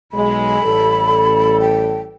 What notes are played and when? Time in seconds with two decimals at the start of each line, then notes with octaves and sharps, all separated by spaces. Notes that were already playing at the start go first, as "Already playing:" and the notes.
0.12 B1 G#3 B5
0.61 A1 G3 A4
1.60 G5